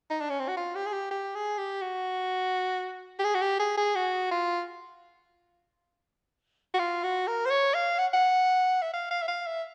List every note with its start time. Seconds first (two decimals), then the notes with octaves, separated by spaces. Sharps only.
0.10 D#4
0.20 D4
0.30 C#4
0.40 C4
0.48 F#4
0.57 F4
0.75 G4
0.86 G#4
0.92 G4
1.11 G4
1.35 G#4
1.58 G4
1.81 F#4
3.19 G4
3.24 G#4
3.34 F#4
3.42 G4
3.59 G#4
3.77 G#4
3.95 F#4
4.31 F4
6.74 F#4
6.79 F4
7.03 F#4
7.27 A#4
7.46 C5
7.50 C#5
7.74 F5
7.98 F#5
8.13 F#5
8.82 E5
8.93 F5
9.11 F5
9.22 E5
9.28 F5
9.47 E5